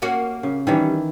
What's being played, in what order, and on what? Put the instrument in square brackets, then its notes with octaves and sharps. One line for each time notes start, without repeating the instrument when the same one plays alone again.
[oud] A#3 C#4 F#4
[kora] C#3
[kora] D#3 E3 D4 [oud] G3 C#4